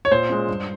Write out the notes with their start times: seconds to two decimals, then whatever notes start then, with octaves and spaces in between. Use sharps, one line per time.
0.05 C#5
0.11 A#2 C5
0.29 G#3 C#4
0.48 G2